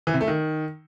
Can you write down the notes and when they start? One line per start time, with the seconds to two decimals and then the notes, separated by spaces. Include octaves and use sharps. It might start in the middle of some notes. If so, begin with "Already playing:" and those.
0.07 E3
0.14 C3
0.21 A3
0.28 D#3